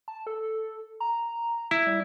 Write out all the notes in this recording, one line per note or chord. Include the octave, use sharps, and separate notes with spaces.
A5
A4
A#5
E4
G3